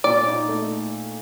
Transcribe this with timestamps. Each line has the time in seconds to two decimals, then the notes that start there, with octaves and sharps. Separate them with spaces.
0.04 A#2 D5
0.27 D#4
0.48 A3